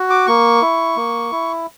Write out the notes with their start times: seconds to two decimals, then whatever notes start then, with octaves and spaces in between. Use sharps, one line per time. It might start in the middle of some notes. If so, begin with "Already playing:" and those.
Already playing: F#4
0.10 D6
0.27 A#3 C#6
0.62 E4
0.97 A#3
1.32 E4